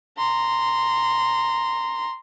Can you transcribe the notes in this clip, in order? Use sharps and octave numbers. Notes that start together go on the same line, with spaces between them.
A#5 C6